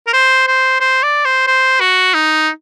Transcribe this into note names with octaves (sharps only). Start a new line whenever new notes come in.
A#4
C5
C5
C5
D5
C5
C5
F#4
D#4